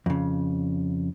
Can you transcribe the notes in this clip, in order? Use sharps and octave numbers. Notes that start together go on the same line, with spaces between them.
F2 C#3